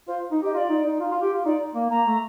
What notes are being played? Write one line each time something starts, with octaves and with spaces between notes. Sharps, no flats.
F4 C5
D#4
G4 D#5
F4 D5 D#5
D#4
D#4
F4
F4
G4
F4
D#4 D5
A#3
A#3 A#5
A3